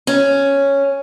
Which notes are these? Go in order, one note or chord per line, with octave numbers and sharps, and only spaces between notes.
C#4